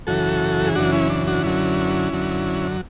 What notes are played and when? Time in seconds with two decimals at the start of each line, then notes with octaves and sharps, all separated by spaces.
0.07 F#2 C#3 E3 F#4 A4
0.67 G#4
0.75 F#2 C#3 E3 D4 F#4
0.92 C#4 E4
1.10 D4
1.27 D4 F#4
1.44 F#2 D3 F#3 C#4 E4
2.12 F#2 D3 F#3